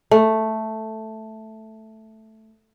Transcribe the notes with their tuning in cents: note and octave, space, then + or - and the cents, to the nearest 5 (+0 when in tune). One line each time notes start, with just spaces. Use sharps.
A3 +0